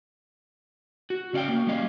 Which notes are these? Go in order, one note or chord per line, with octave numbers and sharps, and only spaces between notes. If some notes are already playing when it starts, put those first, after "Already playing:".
F#4
C#3 C#4 D5 F5 G5
A#3 F#4
G3 A#3 C#4 D#5 F5